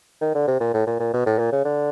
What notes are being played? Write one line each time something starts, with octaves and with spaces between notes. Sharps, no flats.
D#3
D3
C3
A#2
A2
A#2
A#2
B2
A2
A#2
C#3
D3